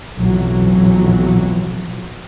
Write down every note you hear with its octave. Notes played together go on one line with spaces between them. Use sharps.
B1 F2 A2 E3 F#3